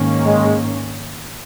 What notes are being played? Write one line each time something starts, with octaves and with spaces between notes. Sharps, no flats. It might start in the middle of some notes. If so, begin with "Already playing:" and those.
Already playing: G#2 D#3 A#3 C#4
G#3